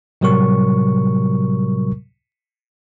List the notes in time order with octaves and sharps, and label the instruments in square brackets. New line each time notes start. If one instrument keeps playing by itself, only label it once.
[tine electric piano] A2 C3 F#3 G3 A#4 C#6